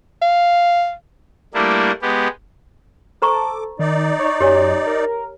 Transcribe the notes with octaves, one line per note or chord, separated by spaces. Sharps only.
F5
G3 A3 A#3 D4 E4
G#3 B3 G4
A4 C5 A#5 C#6 D6
D#3 D#4 D5
C#5
F#2 G4 C#5 G#5
A#4